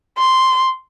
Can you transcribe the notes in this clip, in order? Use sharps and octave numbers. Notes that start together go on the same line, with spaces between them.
C6